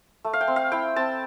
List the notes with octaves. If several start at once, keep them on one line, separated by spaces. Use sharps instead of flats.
A3
F5
G5
C4
F5
E4 G5
C4 A5